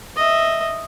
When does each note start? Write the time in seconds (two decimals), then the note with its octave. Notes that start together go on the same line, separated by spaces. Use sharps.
0.16 D#5 E5